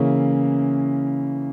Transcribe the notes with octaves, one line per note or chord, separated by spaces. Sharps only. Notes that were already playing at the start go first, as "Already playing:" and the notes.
Already playing: C#3 E3 A#3 C#4 E4